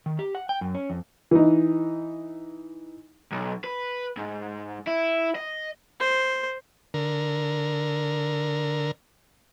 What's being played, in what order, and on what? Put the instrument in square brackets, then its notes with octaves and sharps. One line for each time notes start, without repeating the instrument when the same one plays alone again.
[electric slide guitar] D#3
G4
F#5
G5
F#2
C#4
F2
[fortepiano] E3 D#4
[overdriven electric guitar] B1
B4
G#2
E4
D#5
[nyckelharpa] C5
[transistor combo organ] D3 A#4